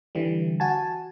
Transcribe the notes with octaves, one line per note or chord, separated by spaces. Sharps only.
D3 E3 G3
F#4 G#5 A5